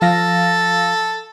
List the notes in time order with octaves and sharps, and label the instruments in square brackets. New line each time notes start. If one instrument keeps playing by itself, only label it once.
[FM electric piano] F3 F5 A#6 [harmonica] A4